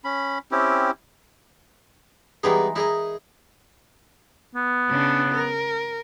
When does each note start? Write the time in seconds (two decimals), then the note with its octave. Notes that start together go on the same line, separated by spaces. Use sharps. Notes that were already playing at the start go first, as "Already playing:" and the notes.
0.04 C#4 B5
0.51 C4 C#4 E4 G4
2.43 E3 G3 G#3 B3 D#4 G#4
2.76 D#4 E4 G#4 A#4 D#5
4.55 B3
4.90 C#3 D4
5.34 A#4